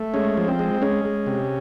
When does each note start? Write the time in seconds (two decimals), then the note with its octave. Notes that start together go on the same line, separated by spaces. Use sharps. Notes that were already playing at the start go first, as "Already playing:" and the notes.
Already playing: A3
0.14 G#3 C#4
0.37 F3
0.48 C4
0.59 G#3
0.82 G#3 C#4
1.05 G#3
1.26 C3